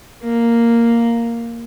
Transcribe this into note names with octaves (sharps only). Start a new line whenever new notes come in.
A#3